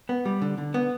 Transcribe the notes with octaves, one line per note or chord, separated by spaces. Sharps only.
B3
G3
D3
D3
B3